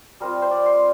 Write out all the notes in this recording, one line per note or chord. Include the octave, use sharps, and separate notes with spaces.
G3 C4 F4 A#4
C5
D5
C6